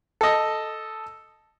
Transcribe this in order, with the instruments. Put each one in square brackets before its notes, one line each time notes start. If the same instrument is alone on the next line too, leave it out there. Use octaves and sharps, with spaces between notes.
[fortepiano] A4 D#5